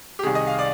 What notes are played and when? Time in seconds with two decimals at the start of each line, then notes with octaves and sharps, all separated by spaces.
0.19 G4
0.23 C2 C3 D#3 G#4
0.35 D#5
0.47 F5
0.59 D5